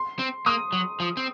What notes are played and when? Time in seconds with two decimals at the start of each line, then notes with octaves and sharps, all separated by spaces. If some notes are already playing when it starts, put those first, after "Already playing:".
Already playing: C6
0.19 C4
0.46 A#3 D#6
0.73 F#3
1.00 F3
1.17 C4